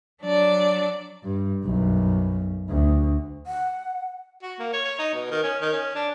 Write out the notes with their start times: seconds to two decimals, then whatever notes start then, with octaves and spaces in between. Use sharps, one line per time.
0.23 F#3 D4 D5
1.24 G2
1.64 B1 F#2
2.69 D2
3.47 F#5
4.43 F#4
4.59 A#3
4.73 C#5
4.85 C#5
4.99 D#4
5.14 B2
5.31 D#3
5.43 C#4
5.61 D#3
5.73 C#4
5.95 D4